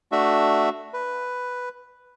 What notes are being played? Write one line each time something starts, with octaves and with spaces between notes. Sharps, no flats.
A3 D4 F#4 E5
B4